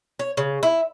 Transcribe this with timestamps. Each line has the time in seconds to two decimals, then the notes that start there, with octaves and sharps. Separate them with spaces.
0.19 C#5
0.37 C#3
0.63 E4